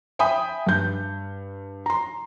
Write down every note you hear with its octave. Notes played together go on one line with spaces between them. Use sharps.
E5 G5 G#5 B5 D#6
G2 G6
A#5 C6